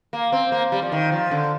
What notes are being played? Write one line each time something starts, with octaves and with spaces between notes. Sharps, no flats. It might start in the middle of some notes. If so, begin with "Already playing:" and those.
A#3
C4
A#3
G3
F3
D#3
F3
D3